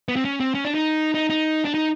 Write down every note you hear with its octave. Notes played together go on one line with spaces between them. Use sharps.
B3
C4
C#4
C4
C#4
D4
D#4
D#4
D#4
D4
D#4